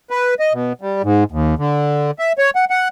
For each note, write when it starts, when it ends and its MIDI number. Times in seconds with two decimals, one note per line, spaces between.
0.10 0.34 71
0.39 0.53 75
0.53 0.73 47
0.81 1.02 55
1.03 1.24 44
1.32 1.55 39
1.59 2.11 50
2.19 2.33 76
2.38 2.50 73
2.55 2.65 78
2.70 2.88 78